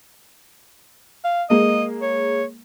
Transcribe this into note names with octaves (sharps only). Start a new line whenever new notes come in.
F5
G#3 A#3 D#5
C#5